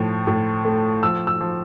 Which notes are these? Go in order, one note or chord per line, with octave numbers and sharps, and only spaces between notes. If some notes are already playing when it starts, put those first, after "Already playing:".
Already playing: A2 F3
A2
A3
F3 E6
E6
F3